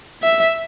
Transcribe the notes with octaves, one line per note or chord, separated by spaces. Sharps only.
E5